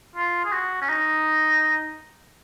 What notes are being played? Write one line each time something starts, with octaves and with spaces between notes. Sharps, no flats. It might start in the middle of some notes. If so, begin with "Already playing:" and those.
F4
G#4
F#4
C#4
D#4